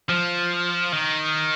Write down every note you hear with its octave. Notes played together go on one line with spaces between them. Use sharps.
F3
D#3